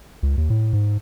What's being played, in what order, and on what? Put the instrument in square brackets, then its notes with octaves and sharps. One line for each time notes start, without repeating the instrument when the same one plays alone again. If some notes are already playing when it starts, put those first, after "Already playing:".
[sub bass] C#2
D#2
A2
G#2